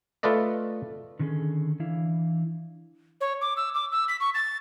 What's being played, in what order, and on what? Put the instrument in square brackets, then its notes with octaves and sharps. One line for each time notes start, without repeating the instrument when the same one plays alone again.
[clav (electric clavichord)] A3 F4 A4 B4 D5 D#5
[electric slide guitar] D3 D#3 F#3 C#4 G#4 A4
E3 D4 E4 F5
[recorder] C#5
D6
E6
D6
E6
B6
C#6
A6